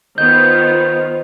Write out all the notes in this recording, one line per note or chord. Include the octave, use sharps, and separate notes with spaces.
D#3 B3 F4 C5 D#5 G6